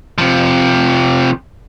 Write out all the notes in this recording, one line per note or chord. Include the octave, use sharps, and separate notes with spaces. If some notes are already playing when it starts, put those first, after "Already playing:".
C3 F3